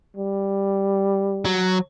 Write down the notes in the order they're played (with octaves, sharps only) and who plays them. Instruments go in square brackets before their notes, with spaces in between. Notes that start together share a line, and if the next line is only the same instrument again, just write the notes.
[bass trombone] G3
[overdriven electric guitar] F#3